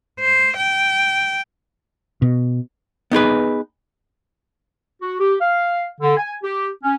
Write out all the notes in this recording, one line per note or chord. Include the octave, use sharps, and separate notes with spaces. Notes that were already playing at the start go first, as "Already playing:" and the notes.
C5
G5
B2
B3 D#4 G#4 B4
F#4
G4
F5
D3
G#5
G4
C#4